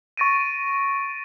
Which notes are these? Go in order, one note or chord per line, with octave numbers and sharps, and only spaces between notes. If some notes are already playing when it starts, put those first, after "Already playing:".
C#6 A6 A#6 D7 D#7